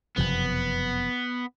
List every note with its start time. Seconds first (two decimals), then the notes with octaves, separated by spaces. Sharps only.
0.17 F#1 F2 C3 F3 B3